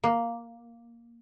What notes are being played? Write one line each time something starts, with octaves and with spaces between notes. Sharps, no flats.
A#3